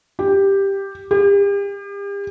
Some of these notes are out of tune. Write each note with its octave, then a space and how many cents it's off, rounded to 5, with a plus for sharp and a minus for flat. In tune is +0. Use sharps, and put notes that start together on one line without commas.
G4 +5
G4 +40